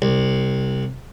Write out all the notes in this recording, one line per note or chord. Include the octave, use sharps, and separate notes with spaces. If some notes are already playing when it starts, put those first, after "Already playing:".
C2